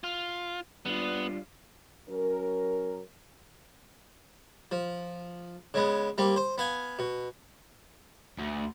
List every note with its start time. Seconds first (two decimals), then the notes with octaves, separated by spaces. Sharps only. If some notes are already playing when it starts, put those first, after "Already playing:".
0.04 F4
0.86 G3 B3 D4 F4
2.09 F#3 C#4 A#4
4.72 F3
5.74 C#3 G#3 B3
6.18 G3 A#3 C4
6.36 C5
6.58 B3 F5 G#5
6.99 B2
8.38 D2